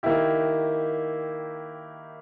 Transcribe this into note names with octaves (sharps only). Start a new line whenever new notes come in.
D#3 A#3 E4 G4